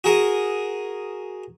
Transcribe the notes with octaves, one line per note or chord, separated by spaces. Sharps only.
F#4 G#4 A#4 G#5 D#6